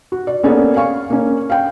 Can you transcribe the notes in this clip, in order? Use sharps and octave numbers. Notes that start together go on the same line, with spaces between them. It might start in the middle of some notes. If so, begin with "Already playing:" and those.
F#4
D5
A#3 B3 C#4 G#4 A4 D5
F5 G#5 C#6
A#3 C#4
F5 G5